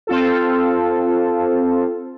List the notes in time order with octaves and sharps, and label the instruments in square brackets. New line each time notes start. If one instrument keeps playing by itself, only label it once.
[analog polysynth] C4 F4 A4